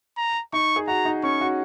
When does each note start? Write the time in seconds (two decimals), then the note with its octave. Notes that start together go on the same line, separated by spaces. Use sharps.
0.17 A#5
0.53 D#4 C#6
0.76 G#4
0.87 F#4 A#5
1.05 D#4
1.23 C#4 C#6
1.41 F#4